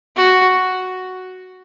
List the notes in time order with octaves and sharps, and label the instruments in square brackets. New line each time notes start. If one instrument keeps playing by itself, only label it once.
[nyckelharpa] F#4